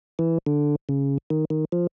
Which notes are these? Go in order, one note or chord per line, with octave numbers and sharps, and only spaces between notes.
E3
D3
C#3
D#3
D#3
F3